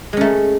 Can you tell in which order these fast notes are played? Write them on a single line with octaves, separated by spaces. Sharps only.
G#3 C#4 A3